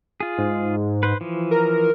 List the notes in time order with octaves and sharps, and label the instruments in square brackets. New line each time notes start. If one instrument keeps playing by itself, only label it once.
[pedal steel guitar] F4 G#4
[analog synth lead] G#2
[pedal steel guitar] B4 C5
E3 F3
[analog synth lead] A#4